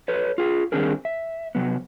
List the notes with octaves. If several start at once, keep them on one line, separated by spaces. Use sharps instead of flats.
A4 B4 C#5
F4 G#4
D#3 G3 C4 D4 G#4 A#4
E5
C3 F#3 B3